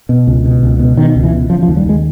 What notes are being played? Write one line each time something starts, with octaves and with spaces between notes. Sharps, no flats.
B2
C#2
B2
C#2
B2
B2 D#3
C#2
E3
B2
C#3 F3
F3
D#2
G3
D#2 G#3